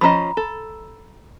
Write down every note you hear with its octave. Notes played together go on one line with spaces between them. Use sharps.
F3 C#4 D#5 A#5 B5
A4